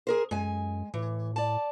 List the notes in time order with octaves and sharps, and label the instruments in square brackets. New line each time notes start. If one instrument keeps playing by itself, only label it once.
[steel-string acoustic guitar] G#4 A#4 C5
[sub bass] F#2 [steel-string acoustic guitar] G#3 G#5
[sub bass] A2 [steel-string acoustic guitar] E3
[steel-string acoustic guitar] D5 A5